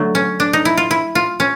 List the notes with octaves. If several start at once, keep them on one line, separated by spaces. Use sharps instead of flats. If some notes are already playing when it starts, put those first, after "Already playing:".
Already playing: D3 F#3 A3
C#4
D4
D#4
E4
F4
E4
F4
C#4